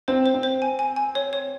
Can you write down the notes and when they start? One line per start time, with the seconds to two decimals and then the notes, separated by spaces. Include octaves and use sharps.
0.08 C4 C5
0.26 C5
0.34 C4
0.43 C5
0.62 G#5
0.79 G#5
0.96 G#5
1.15 C#5
1.33 C#5